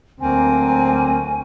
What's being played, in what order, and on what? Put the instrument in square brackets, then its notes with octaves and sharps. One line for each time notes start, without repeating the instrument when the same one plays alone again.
[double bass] D2 [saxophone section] F#3 A#3 C4 [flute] G#5